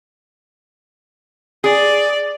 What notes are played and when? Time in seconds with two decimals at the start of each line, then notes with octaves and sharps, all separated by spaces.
1.64 G#4 D5